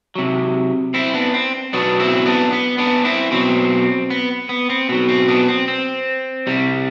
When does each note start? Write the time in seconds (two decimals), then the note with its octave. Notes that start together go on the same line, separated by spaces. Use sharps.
0.15 C3 F#3
0.94 C4 E4
1.14 B3 D4
1.34 C4
1.73 B2 F#3 B3 D4
2.00 C4 E4
2.26 B3 D4
2.52 B3
2.78 B3 D4
3.05 C4 E4
3.31 B2 F#3 C4
4.10 B3
4.49 B3
4.70 C4
4.89 B2 F#3 B3
5.09 C4
5.28 B3 D4
5.48 C4
5.68 C4
6.47 C3 G3